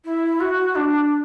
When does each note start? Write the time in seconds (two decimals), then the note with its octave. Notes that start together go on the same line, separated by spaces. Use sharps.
0.04 E4
0.40 F#4
0.75 D4